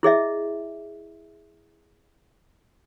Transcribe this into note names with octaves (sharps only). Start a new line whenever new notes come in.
E4 G#4 D#5 E5